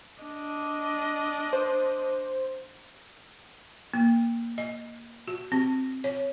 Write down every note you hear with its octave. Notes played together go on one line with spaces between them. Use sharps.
D4 D#5
C5
A#3
D#5
F#4
C4
C#5